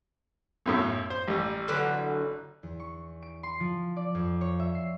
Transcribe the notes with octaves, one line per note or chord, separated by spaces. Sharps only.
B1 F#2 A2
C5
A1 G3
D3 E3 F#3
E2
C#6
D7
C6
F3
D5
F2
C#5
E5
C7